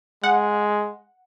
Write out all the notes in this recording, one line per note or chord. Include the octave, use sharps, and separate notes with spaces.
G#3 F#5